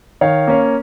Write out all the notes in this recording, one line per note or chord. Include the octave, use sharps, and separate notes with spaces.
D#3 C#5 F5
A#3 C#4